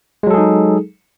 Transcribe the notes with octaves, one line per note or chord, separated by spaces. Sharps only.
F#3 G#3 D#4 G#4 A4